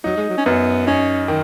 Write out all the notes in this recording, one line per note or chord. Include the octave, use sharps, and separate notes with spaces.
F#3 D#4
G#3
F#3
C#4
F#2 B3
C#4 D#4
D#3